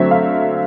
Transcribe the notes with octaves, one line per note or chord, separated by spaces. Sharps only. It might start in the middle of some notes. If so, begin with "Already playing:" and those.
Already playing: D3 F#3 A3 C4 E5
F5